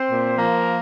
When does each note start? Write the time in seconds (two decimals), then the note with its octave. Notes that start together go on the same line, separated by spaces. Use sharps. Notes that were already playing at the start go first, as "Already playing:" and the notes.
Already playing: C4 C5
0.09 A#2
0.36 F3 A#3 A#4